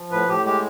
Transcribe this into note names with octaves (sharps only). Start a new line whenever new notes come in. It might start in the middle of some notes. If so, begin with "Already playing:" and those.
Already playing: F3
A2 B4
A2 G4
G#3 G4